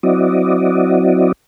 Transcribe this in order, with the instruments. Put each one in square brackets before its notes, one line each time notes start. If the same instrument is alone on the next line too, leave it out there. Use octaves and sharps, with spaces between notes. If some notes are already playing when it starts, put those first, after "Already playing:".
[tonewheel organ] F#3 C4 E4 F#4 D5 D#5